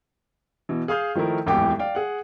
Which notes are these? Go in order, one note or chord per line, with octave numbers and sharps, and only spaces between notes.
B2 E3
G#4 F5 D#6 F6 G6
D#3 F3 A3 E4 A#4
D1 G#1 E2 G4 G5 D6
D5 F5 G5
G#4 F#5